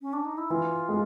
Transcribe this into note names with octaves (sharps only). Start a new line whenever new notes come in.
C#4
D4
D#4
E4
E3 F4
G#3